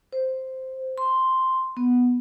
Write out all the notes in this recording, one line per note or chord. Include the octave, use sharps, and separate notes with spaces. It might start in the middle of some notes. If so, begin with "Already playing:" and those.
C5
C6
B3